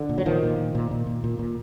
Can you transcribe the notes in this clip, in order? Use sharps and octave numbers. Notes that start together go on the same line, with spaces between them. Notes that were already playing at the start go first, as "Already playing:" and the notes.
Already playing: D3
A#2
F#3
A#2 D#3 F3
A#2
A#2
A#2
A#2
A#2
A#2
A#2